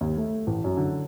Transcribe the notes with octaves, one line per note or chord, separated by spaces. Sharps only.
D#2
A3
A1
F#2
D3